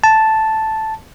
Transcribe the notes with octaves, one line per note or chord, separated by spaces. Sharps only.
A5